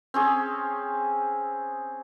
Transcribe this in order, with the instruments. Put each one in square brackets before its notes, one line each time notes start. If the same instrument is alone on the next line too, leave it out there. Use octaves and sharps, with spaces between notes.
[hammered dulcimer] C4 C#4 G#4